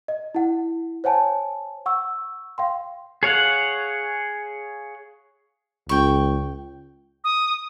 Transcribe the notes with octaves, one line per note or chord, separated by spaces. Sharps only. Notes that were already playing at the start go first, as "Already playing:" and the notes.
D#5
E4 F#5
C5 C#5 F#5 G#5 A5
F#5 C#6 E6
F5 G5 C6
G#4 C#5 F5 F#5
C#2 G5 C#6
D#6